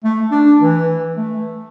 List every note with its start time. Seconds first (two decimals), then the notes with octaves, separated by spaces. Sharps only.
0.04 A3
0.31 D4
0.62 E3
1.17 A3